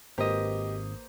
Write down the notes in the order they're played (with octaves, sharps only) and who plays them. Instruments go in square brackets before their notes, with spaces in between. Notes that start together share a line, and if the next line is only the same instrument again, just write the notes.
[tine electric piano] G#1 D#6 [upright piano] A#3 B4 C5 [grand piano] G4 D#5